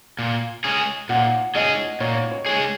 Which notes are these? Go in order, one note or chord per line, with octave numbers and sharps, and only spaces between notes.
A#2
G#3 C#4 G#4
A#2 F#5
G#3 C#4 G#4 D#5
A#2 C#5
C#5
G#3 C#4 G#4